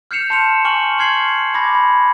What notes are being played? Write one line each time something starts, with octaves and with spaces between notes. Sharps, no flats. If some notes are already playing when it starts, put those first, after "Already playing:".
F6 G6 C7 C#7 E7 F7
A5 C6 C#7 E7 F7
G#5 C#6 F6 F#7
C6 C#6 F6 G#6 C7 F#7
B5 D6 G#6 A#6
B5